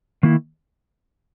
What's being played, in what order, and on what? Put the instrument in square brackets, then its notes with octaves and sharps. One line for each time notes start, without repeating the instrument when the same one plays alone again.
[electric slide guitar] D#3 A#3 E4